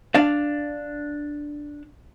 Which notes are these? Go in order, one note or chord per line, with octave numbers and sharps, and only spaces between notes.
D4 D5 F5